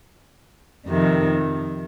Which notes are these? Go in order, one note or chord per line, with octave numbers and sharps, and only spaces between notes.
F2 C3 D#3